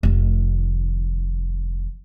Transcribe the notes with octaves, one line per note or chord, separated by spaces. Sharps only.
F1 D#3